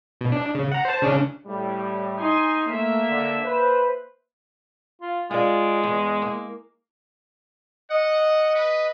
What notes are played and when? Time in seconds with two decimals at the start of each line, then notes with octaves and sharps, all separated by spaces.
0.21 B2
0.32 D4
0.55 C#3
0.72 F#5 A#5
0.85 C5 A5
1.02 C#3 C#4 D4
1.46 A2 G3
2.19 D#4 G#5 C6
2.69 A3 A#3 E5
3.09 D3
3.44 B4 C5
5.01 F4
5.31 G#3 F4 D5
5.84 E2
6.22 A#3
7.91 D#5 F#5
8.55 B4